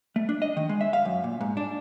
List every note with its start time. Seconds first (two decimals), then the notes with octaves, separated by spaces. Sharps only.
0.16 A3
0.29 D4
0.42 D#5
0.57 D#3
0.69 G#3
0.81 E5
0.93 F5
1.05 F#2
1.24 A#2
1.41 G#2
1.57 D4